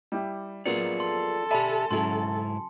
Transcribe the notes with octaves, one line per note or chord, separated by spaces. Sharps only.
G3 E4 G4
F#3 A#3 B3 F4 G#4 D5 C#7
A4 C6
G4 D5 E5 G#5 A5 B5
G#2 C#3 F#3 E4 C6